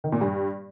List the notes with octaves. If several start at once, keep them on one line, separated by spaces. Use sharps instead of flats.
D#3
A#2
G2